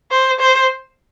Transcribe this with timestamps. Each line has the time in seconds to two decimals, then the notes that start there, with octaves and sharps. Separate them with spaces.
0.12 C5
0.40 C5